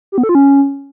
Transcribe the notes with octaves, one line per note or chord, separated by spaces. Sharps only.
G4
B3
A4
F4
C#4